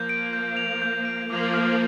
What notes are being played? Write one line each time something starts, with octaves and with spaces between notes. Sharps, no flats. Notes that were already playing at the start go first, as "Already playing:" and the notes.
Already playing: F3 A#3 G6
D7
G6
F7
G6
D7
F3 A#3 D6
F6